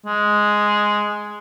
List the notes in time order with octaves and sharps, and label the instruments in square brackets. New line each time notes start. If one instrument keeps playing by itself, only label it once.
[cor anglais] G#3